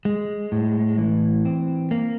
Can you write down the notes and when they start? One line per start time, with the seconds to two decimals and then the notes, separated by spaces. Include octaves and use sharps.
0.05 G#3
0.52 A2
0.98 E3
1.45 C4
1.91 A#3